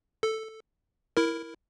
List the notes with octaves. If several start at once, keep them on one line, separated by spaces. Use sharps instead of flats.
A4
E4 A#4